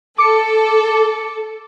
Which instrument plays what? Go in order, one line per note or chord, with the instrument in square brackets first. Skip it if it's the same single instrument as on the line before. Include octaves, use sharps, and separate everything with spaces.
[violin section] A4 [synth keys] D6 C#7